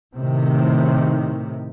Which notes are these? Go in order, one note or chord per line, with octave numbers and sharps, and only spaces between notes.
A2 C3 D#3